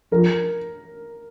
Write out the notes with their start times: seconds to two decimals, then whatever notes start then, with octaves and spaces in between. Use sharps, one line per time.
0.12 F3 A#4